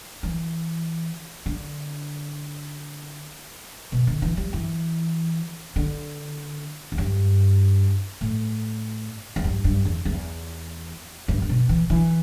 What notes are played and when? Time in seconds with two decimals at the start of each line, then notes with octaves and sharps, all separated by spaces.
0.23 E3
1.46 D3
3.92 B2
4.07 D3
4.22 E3
4.37 G3
4.53 E3
5.76 D3
6.92 E2
6.98 G2
8.21 A2
9.36 E2
9.44 G2
9.64 G2
9.85 E2
10.05 E2
11.28 G2
11.42 D3
11.49 B2
11.69 E3
11.90 E3